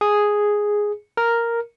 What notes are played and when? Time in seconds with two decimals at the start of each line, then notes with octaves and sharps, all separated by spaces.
0.01 G#4
1.17 A#4